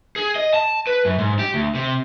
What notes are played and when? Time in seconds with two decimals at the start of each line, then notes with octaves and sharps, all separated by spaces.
0.16 G#4
0.35 D#5
0.54 A5
0.87 B4
1.05 F#2
1.18 G#2
1.39 G4
1.54 D2
1.75 C3